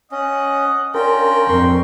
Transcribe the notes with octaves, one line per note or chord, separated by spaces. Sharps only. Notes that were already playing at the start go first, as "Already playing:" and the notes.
C#4 D#5 F#5 D#6
C#4 D4 F4 G4 A#4 G5
F2 C6 C#6